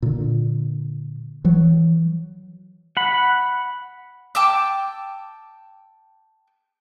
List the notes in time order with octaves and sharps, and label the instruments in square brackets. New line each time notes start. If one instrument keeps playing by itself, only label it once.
[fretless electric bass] A#2 D3
E3 F#3
[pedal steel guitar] F#5 B5
[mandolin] G5 A5 D6 E6